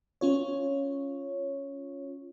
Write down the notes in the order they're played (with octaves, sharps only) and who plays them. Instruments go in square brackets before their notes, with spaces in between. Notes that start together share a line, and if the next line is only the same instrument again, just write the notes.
[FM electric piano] C#4 F4 C#5